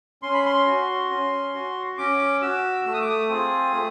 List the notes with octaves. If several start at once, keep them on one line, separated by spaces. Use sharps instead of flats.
C#4 C6
B5
C6
F#4
C#4
F#4
C#4 D6
F#4 E6
A3 E6
D#6
D6
D#6
C4 F4 G#4
A3